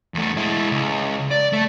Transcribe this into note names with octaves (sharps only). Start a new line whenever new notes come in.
E2 A3
G#3 E4
C#2
D5
A3